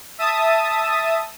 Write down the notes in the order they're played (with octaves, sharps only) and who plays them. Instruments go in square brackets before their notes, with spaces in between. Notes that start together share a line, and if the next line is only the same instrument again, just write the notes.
[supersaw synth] E5 A5 D#6